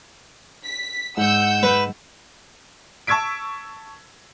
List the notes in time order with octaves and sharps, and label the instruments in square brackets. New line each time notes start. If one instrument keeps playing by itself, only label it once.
[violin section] B6
[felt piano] G#2 [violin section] F#5 E6 G6
[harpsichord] B4
[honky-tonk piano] A5 C#6 E6 G#6 B6 D7